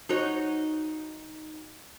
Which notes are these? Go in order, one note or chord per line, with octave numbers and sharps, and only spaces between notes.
D#4 F#4 C#5